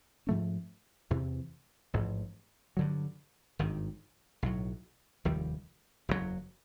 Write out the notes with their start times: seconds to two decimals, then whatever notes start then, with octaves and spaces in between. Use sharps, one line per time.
0.27 G#2 F3 A3 C#4
1.10 E2 C3 E3
1.94 A1 G#2 F3
2.77 G2 D3 F#3
3.59 G#1 G2 D#3
4.42 B1 A2 F#3
5.25 F1 D#2 D#3 G3
6.09 F#1 E2 B2 F#3